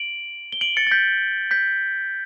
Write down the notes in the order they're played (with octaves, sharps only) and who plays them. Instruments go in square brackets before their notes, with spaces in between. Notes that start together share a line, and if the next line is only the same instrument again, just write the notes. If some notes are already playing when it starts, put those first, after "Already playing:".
Already playing: [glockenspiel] D7 F#7
G7
D7 F#7
A6 C#7
A6
G6 B6
G6 B6